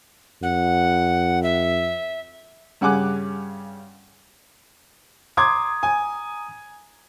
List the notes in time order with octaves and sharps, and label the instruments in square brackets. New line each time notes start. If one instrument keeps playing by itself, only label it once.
[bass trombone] F2 [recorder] F#5
[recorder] E5
[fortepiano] G2 C#3 F#5 G#5 D6 F#6
[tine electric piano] A#5 D#6 [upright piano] C6 D6 G#6
[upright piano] G#5